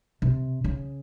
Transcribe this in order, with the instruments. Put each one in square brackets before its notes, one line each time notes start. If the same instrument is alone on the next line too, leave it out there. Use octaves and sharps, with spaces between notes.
[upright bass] C3
C#3